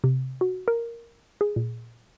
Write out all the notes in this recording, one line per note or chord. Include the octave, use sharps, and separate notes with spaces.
C3
F#4
A#4
G#4
A#2